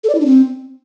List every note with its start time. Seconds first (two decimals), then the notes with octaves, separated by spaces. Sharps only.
0.04 A4
0.09 D5
0.15 E4
0.20 D4
0.26 C4